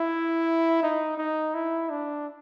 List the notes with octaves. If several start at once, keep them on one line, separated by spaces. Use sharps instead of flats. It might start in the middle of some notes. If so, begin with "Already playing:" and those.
Already playing: E4
D#4
D#4
E4
D4